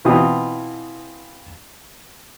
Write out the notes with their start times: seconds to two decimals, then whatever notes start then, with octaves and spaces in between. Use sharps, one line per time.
0.05 B2 E3 C4 E4 F4 D#6